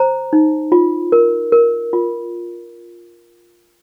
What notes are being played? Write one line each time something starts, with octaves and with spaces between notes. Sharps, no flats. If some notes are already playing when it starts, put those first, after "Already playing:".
Already playing: C5 A#5
D#4
F4
A#4
A#4
F4